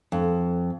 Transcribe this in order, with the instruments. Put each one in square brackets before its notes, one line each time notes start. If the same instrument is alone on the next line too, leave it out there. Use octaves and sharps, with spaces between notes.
[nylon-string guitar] F2